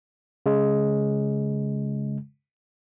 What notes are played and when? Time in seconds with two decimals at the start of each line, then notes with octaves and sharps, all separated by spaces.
0.46 C#3 G#3